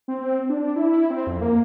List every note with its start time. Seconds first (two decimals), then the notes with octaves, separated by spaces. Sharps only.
0.08 C4
0.49 D4
0.76 E4
1.10 C4
1.27 F2
1.41 A#3